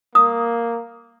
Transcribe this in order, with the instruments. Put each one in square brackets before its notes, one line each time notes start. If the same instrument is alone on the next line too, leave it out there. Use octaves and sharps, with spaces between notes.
[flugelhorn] A#3 [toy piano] D#6